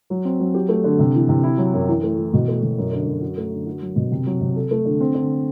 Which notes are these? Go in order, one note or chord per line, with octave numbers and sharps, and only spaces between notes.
F#3
C4
F#3
G4
A3
D3
C3
E3
C3
E4
F#3
F#2
E3
A3
E3
B2
A3
B2
F#2
D3
F#2
F#4
A3
D3
F#4
F#3
B2
C3
F#3
C3
A4
A3
D3
C4
D3